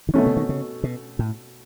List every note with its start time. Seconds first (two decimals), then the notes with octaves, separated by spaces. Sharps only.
0.09 D#3
0.14 B2 E3 A3 C#4
0.26 C#3
0.37 D#3
0.49 C#3
0.84 B2
1.19 A2